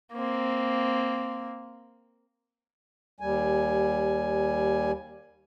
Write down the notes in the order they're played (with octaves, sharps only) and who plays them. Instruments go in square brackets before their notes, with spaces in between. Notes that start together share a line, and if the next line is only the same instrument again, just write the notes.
[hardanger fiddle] A#3 C4
[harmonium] D#2 G3 G#5